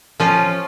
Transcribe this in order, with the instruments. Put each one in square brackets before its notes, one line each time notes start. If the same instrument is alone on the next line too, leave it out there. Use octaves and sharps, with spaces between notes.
[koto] F3 C#4 F4